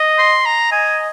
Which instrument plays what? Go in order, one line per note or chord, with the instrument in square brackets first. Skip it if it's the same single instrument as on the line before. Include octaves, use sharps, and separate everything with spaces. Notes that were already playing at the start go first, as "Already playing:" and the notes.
Already playing: [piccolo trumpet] D#5
[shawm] C6
A#5
[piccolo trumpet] D#5 [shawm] G#5